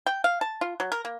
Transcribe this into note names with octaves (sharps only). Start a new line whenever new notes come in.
G5
F5
A5
F4
F#3
A#4
A#3